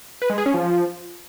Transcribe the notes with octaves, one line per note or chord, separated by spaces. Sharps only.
B4
G#3
G#4
C#4
F3